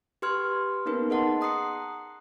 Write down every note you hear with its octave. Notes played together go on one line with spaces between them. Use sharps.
G4 B4 C6 F6 G#6
A#3 B3 C#4 D#4 A#4 B4
G#4 D#5 F#5 A5 C6
A#5 D#6 F#6 C7 C#7